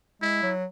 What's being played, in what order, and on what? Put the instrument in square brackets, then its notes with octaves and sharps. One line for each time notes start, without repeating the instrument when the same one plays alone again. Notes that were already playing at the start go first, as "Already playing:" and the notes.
[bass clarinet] G#3 [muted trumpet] E4
[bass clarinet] F#3